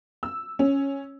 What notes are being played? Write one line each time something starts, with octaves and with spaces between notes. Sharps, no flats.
E6
C#4